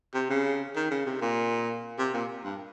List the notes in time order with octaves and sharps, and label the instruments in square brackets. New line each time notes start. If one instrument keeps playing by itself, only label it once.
[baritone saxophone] C3
C#3
D#3
C#3
C3
A#2
C3
A#2
G2